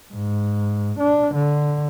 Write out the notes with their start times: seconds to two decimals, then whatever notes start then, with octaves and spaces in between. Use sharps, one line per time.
0.14 G#2
0.99 D4
1.35 D3